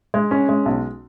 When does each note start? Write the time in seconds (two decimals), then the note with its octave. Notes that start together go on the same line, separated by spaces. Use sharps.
0.14 G#3
0.31 C#4
0.49 G#3
0.66 B1